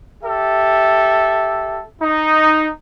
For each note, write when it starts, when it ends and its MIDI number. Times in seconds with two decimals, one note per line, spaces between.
0.23 1.82 67
0.23 1.82 69
0.23 1.82 76
2.02 2.69 63